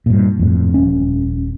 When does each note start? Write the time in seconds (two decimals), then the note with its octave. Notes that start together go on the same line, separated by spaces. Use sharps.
0.06 G2 A#2
0.39 F2 A2
0.74 D#1 C#4